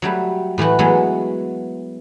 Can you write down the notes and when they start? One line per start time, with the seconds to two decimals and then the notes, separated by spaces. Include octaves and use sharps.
0.02 F#3 G3 A3
0.58 A2 E3 A3 F#4
0.79 E3 F#3 G#3 A3 B3